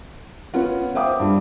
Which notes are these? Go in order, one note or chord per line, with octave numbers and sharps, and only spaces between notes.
B3 C#4 F4 F#5
C5 E5 F5 G5 D6 D#6
G2 G3